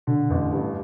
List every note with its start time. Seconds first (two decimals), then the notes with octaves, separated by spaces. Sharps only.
0.07 B2 D3
0.30 A1 F2
0.53 G2